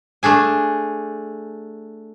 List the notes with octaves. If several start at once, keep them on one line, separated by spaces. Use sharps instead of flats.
A3 D4 G#4 G#5